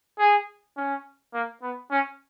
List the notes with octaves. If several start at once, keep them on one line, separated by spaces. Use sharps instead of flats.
G#4
C#4
A#3
B3
C#4